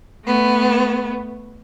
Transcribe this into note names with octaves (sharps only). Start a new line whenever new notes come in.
A3 B3